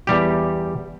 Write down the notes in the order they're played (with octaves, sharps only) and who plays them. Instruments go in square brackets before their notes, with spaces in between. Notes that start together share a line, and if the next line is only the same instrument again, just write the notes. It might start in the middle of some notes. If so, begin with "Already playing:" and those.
[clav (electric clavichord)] E2 G3 G4